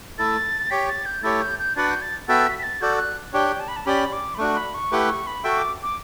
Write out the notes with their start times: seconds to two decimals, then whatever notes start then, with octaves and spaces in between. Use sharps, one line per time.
0.18 A3 E4 A4 A6
0.71 G4 C#5 G5 B6
0.88 A6
1.06 G6
1.23 A3 E4 G4 C#5 A6
1.41 G6
1.59 G6
1.76 D4 F#4 B4 D5 F#5 A6
1.89 G6
2.02 A6
2.28 B3 F#4 A4 E5 G5 A6
2.47 B6
2.59 B6
2.63 A6
2.82 F#4 A4 D5 G6
2.93 E6
2.98 F#6
3.33 D4 G4 C#5 G5
3.60 A5
3.68 B5
3.76 A5
3.86 C#4 G4 D5 B5
4.13 D6
4.35 B5
4.38 A3 D4 F#4 C#6
4.56 B5
4.74 C#6
4.91 A3 E4 G4 B4 F#5
5.08 C#6
5.27 B5
5.44 F#4 A4 E5 G5 C#6
5.58 D6
5.83 D6